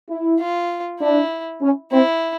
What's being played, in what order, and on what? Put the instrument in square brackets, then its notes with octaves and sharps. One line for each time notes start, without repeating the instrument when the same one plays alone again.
[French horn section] E4
[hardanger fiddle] F4
[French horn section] D4 [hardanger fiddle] E4
[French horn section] C#4
[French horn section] C4 [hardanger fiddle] E4